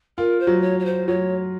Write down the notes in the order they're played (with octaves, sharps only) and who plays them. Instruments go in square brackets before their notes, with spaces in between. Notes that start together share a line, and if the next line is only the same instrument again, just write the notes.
[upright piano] F4 [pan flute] A#4
[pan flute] C5
[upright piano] F#3
[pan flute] C#5
C#5
C5
[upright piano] F#3 [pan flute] C#5